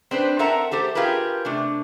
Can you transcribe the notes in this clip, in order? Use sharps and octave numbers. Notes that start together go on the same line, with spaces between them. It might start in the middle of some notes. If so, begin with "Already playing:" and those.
C4 D4 B4 C5
C4 A4 A#4 E5 F#5 A#5
A3 G4 A4 C5
F4 G4 G#4 A#4 B4
C3 A3 D4